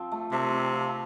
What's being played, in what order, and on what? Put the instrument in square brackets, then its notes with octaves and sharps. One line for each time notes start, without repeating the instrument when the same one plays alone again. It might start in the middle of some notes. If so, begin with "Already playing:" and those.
Already playing: [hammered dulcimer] F3 C4
A3
[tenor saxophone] C3 [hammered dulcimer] A3
[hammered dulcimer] C4
F3